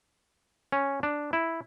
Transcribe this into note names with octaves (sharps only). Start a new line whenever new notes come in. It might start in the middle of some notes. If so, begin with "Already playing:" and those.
C#4
D4
E4